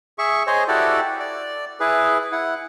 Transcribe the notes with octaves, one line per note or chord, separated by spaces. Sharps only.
G#4 E5 C#6
G#4 C5 C#5 D#5 G#5
E4 F#4 G4 A4 D5
D5
E4 G#4 B4
E4 F#5